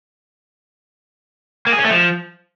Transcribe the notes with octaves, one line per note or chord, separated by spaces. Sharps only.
A#3
G#4
C#4
A3
F3